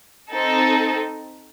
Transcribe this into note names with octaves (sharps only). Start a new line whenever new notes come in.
C4 D#4 A4